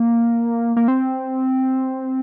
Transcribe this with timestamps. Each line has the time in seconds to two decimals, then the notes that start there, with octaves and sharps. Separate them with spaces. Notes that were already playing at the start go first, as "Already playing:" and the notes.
Already playing: A#3
0.77 A#3
0.88 C4